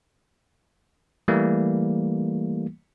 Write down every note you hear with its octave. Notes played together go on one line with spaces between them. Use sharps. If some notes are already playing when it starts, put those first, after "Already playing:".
E3 G3 A3 A#3